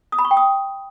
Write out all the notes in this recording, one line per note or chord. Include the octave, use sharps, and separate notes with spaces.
D#6
B5
C#6
G5
D#6